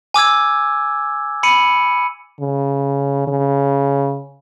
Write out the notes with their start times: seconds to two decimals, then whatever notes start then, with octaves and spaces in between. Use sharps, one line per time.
0.14 G#5 D6 E6 G#6
1.43 B5 C#7 D#7
2.40 C#3
3.28 C#3